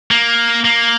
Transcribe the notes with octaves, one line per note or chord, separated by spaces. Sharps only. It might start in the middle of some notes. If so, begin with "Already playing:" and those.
A#3
A#3